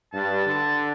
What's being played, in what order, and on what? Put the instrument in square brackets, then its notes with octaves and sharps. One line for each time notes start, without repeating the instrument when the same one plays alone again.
[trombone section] G2 [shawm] A5
[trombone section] D3 [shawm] A5